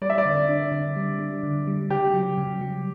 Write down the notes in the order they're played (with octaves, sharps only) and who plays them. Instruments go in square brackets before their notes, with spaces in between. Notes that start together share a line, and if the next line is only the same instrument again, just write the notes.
[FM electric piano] G3 [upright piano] D5
[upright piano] E5
D5
[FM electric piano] D3
D4
D3
G3
G3
D3
G3
[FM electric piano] C#3 [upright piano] G4
[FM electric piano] F#3
C#3
F#3